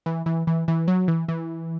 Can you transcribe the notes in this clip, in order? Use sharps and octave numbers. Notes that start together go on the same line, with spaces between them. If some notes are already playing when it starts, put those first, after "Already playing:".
E3
E3
E3
E3
F#3
E3
E3